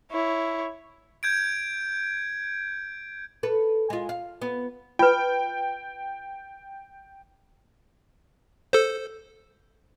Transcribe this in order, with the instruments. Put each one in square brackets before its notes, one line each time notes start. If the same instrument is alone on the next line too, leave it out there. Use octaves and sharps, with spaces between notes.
[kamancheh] E4 C#5
[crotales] G6 G#6 D7
[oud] A4 B4
G#3 F4
F5
B3
[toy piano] F4 B4 [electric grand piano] G5
[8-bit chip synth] A4 C5